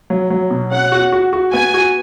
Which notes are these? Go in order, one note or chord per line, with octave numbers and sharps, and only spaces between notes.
F#3
F#3
B2
C#4 F#5
F#4
F#4
F#4
B3 G#5
F#4